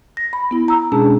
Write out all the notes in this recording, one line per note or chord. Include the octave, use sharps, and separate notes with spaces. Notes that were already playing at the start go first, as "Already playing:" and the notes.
A#6
B5
B3 E4
A#5 E6
B2 G#3 C#4 D4 G#4 A5